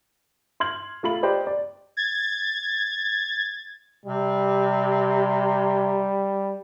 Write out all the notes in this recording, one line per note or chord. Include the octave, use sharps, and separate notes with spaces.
C6 F6 G#6 F#7
A3 F4 B5 F#7
G4 B4 C5 D5 D#5
D5
G#6 A6
C3 G3